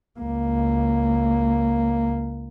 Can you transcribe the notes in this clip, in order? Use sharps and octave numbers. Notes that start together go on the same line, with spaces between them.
C#2 A#3